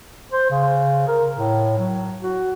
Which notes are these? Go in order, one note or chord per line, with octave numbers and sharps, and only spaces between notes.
C5
C#3
A#4
A2
F#3
F#4